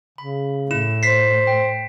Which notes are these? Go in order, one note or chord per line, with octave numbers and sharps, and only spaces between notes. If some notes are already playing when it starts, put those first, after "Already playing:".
C#3 B5
A2 E4 E7
C5 B6 C7
G5